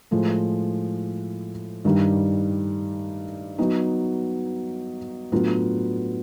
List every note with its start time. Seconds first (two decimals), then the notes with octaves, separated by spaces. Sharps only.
0.11 A2 F3 G#3
1.85 G2 D#3 G3
3.59 F#3 B3 D#4
5.32 A2 F#3 B3 D4 F4